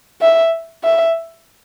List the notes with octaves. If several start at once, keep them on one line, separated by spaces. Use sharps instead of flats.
E5
E5